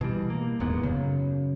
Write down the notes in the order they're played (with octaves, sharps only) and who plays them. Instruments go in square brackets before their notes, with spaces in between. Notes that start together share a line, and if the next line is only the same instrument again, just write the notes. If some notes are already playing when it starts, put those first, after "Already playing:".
[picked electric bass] B2 E3 G3
A#3
D#1 E2 G#2 B3
F#2 C#3